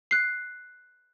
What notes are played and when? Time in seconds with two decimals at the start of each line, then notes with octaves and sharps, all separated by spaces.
0.11 F#6 C7